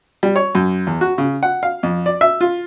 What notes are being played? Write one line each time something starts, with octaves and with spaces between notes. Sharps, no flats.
G3
C#5
F#2
E2
F#4
C#3
F#5
F5
F2
D5
E5
F4